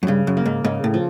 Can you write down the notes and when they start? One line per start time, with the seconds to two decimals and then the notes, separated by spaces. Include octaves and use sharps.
0.03 F#2
0.07 G2 C#3
0.27 F#2
0.37 A#3
0.46 G#2
0.64 G#2 C#3
0.84 A2
0.94 F3